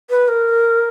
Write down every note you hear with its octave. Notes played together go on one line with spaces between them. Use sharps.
B4
A#4